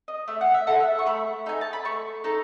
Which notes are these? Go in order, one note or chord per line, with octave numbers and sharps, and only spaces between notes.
D#5
A3 E5
F#5
E5
E4 A4 F#5
E5
C#6
A3 B5
D#4 A4 G#5
A5
B5
A3 C#6
D#4 A4